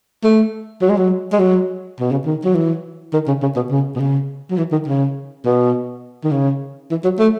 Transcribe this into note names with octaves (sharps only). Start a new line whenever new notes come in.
A3
F#3
G#3
F#3
G#3
F#3
B2
C#3
D#3
F#3
E3
D#3
C#3
C#3
B2
C#3
B2
C#3
F#3
E3
D#3
C#3
B2
D#3
C#3
E3
F#3
A3